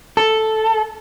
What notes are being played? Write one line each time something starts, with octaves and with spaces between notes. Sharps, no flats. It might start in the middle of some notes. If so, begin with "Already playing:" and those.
A4